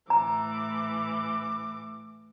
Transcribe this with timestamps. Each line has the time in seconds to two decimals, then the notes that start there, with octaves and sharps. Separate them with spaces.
0.10 A2 E3 A#5 D6